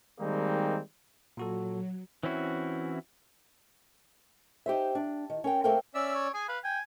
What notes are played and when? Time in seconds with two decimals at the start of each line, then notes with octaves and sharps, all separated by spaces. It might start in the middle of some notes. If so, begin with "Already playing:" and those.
0.20 D#3 G3 G#3 A#3 C4 D#4
1.37 A#2 F#3 F#4 A4
2.23 E3 C4 C#4 E4 F#4
4.66 D#4 G4 C5 E5
4.95 D4
5.30 D#3
5.44 C#4 A#4 G5
5.64 A3 A#3 C4 A4 A#4 G5
5.95 C#4 D5 E5 E6
6.15 C#5
6.34 G#4 G#5
6.49 B4 F5
6.64 G5 G#5